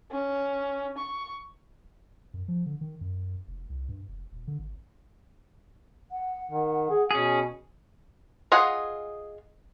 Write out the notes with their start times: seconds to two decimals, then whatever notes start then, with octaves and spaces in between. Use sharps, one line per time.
0.12 C#4
0.97 C#6
2.34 F#2
2.48 F3
2.66 D3
2.81 D#3
3.01 F#2
3.48 F1
3.70 C2
3.89 G2
4.08 F1
4.32 D#1
4.47 D3
4.59 G#1
6.12 F#5
6.51 D#3
6.90 G#4
7.11 B2 C#4 G#4
8.52 F4 G#4 D#5 F#5 G#5